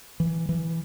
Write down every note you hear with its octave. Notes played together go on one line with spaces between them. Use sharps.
E3
E3